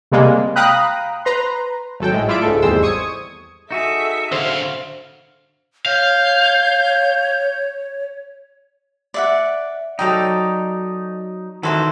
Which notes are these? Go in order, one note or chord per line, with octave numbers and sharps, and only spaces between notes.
C3 G3 G#3 A#3
F5 G5 A#5 B5 D#6 F#6
B4 A#5 C6
G#1 F#3 A4 G5
A2 G#3
E4 F4 D5 E5 D7
C#2 G#2 A3 A4
G#1 E2 G3 G#3 C5 E6
C#6 D#6 G#6 C#7
D#4 F#4 G#4 A4 E5
D3 C5 F5
C#5 F5 G6
D5 E5 F#5
F#3 D#4 A4 D5 G5
D#3 E3 F#4 A4 C5 E5